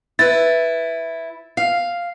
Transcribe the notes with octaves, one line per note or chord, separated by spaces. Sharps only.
E4 B4 A6
F5